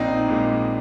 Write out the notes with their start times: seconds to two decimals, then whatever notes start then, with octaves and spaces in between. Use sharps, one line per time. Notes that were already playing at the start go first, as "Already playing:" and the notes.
Already playing: A#1 C4 D#4
0.28 A#2 G#3